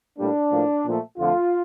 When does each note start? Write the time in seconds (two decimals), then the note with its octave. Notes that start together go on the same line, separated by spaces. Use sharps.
0.17 A2 G3 A#3 D4
0.51 A2 F3 A#3
0.84 A#2 F3 A3
1.18 F2 D3 A3 F4